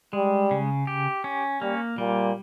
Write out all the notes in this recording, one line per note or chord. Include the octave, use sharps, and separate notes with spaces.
G3 G#3
C#3
G4
C#4
G3 A#3
A#2 G3